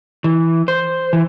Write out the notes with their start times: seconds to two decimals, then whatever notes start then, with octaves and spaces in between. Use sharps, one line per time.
0.24 E3
0.68 C5
1.13 E3